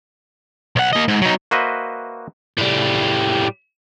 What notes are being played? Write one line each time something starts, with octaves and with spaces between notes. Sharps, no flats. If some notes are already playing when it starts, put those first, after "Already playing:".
B1 F#5
A#3 D#5
G#2
F#3 D#4
A#3 F#4 B4 C5 D#5 E5
A2 G3